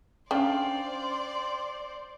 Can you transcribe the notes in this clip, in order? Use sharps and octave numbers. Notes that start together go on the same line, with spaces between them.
C#4 D4 C5 D5 F5 G5 C6